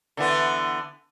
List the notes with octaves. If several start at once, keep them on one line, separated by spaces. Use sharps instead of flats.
D3 E3 B3